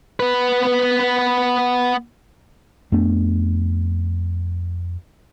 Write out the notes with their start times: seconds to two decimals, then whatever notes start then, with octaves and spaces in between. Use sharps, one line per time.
0.20 B3 B4
2.92 F2 A3 B3 D4